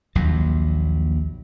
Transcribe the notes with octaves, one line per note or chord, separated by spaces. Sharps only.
A#1 D#2 F#3